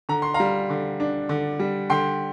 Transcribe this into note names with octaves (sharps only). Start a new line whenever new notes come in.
D3 A#5
C6
F5 A#5
G3
D3
D4
D3
G3
D3 G5 C6